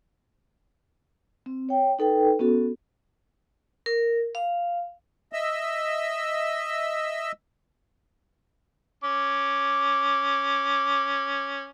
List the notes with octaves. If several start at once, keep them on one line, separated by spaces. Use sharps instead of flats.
C4
C#5 G5
D#4 A4 B4 G5
B3 C#4 F#4 A4
A#4
F5
D#5 E5 E6
C#4 D6